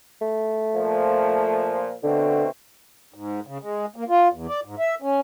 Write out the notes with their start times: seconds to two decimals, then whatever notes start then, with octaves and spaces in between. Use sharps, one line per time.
0.22 A3
0.75 A#2 F3
2.04 B2 D3 A3 C4
3.14 G#2
3.47 C#3
3.62 G#3
3.96 A#3
4.09 F4
4.33 E2
4.48 D5
4.65 G#2
4.79 E5
5.02 C#4